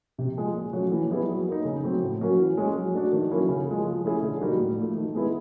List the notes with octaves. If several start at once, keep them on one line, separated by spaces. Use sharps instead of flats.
C3
F3 G#3
A#2
F#3 A3 C#4 F#4
E3
G3 B3 E4 G#4
F#3
A#3 D#4
C#3
F#3 A3 C4
A2
F#3 A#3 C#4 F#4
E3
G#3 C#4
F#3
A3 D4 F#4
D#3
F#3 A#3 C#4 E4
C#3
F3 G#3
F3
A3 C#4 E4 G#4
D3
G3 A#3 D#4 F#4
A2
F3 A3
D#3
G#3 B3 E4 G#4